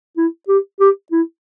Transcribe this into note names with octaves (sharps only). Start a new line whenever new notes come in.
E4
G4
G4
E4